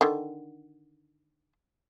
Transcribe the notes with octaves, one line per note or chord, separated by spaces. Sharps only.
D3 D#3